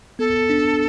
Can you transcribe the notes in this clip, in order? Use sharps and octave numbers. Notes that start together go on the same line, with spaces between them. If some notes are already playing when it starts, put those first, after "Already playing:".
B3 A4
D4